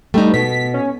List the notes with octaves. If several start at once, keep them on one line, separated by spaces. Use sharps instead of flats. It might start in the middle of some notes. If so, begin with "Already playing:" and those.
G3 A3 D#4
B2 B6
C#4